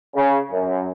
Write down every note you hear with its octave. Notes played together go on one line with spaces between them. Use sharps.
C#3
F#2